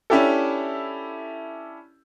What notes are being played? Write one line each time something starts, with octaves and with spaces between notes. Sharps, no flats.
C#4 D4 E4 G4 A4